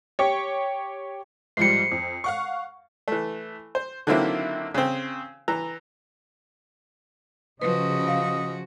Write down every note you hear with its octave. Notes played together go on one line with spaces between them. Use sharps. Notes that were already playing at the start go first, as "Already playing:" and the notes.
G4 C#5
G#2 F3 G3 C7 C#7
F2
F5 F#5 C#6
E3 A3
C5
D3 D#3 F#3 A#3 C4 E4
C#3 C4
E3 A#5 E6
C#3 F3 F#4 B4 D#5
F5